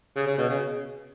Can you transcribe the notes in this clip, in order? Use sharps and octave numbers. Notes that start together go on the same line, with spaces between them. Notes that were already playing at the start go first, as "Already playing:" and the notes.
C#3
C#3
B2
C#3